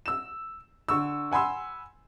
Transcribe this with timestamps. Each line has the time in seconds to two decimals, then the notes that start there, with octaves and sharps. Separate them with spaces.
0.06 E6 E7
0.88 D3 C#6 E6
1.32 F#5 G#5 B5 C6 E6